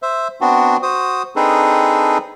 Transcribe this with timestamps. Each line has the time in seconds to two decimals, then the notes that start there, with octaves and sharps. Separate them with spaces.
0.02 C5 E5
0.41 B3 C4 D4 F#4
0.83 F#4 C5 D#6
1.36 C4 D4 D#4 G#4 A4 B4